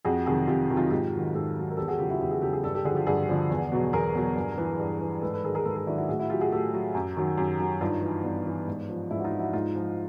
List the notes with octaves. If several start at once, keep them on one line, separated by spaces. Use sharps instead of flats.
F2 F#4 G#4
C3 D#3 F#3 F#4 G#4
F2 F4 G4
C3 D#3 F#3
D#4 F4
G#2 F4 G4
D#3 F#3
G#2 G4 A4
D#3 F#3
A#4
E2 G4 A4
F#4 G#4
C#3 F#3 F4 G4
E4 F#4
E2 F4 G4
F#4 G#4
C#3 F#3 G4 A4
F#4 G#4
G2 G4 A4
G4 A4
D3 F3 F#4 G#4
F4 G4
G2 F#4 G#4
D3 F3
E2
B2 F#3
E2 G#4 A#4
B2 F#3
G2
E3
G2
E3
G#2 A4 B4
A4 B4
D#3 F#3 G#4 A#4
G#4 A#4
G#2 A4 B4
G#4 A#4
D#3 F#3 D4 E4
E4 F#4
A2 F#4 G#4
E4 F#4
F#3 F4 G4
F#4 G#4
A2 G4 A4
F#3
F#2
D#3 F#3
F#2
D#3 F#3
G2 D#4 F4
E3
G2 B3
E3
G#2
F3
G#2 D4 E4
F#4
D#4 F4
F3
E4 F#4
G#2 D#4 F4
F3